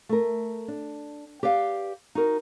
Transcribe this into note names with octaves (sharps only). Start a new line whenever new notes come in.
A3 A#4
D4
G4 B4 D5 F5
D#4 F#4 A#4